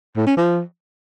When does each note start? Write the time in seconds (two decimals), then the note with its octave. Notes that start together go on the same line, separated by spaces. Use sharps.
0.16 A2
0.27 C#4
0.37 F3